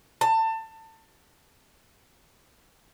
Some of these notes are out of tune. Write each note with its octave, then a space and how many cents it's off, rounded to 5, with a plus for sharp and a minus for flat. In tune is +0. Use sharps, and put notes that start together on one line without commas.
A5 +25